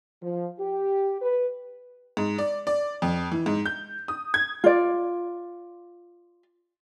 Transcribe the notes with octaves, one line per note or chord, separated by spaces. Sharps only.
F3
G4
B4
G#2
D5
D5
F2
E3
G#2
G6
D#6
G#6
F4 D5